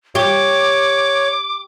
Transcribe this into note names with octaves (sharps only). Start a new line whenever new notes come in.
G4 C#5 D6